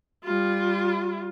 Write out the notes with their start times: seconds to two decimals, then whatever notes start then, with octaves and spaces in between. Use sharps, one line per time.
0.24 G3 F4